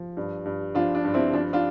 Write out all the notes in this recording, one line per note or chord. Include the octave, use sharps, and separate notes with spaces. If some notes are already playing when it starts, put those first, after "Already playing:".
Already playing: F3
G2
G2
F3 D4 F4
D4
G2
C4 E4
F3 D4
D4 F4